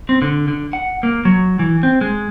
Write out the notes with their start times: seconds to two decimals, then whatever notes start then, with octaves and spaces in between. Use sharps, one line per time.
0.09 C4
0.22 D3
0.48 D3
0.73 F#5
1.03 A#3
1.25 F#3
1.59 E3
1.83 C4
2.01 G#3